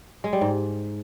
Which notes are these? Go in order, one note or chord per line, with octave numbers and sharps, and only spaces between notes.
G#3
G3
G#2